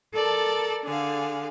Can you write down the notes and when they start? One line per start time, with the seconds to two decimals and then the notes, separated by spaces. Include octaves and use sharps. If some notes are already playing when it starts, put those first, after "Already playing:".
0.14 A4 A#4 D5 A5
0.83 D3 G#4 F5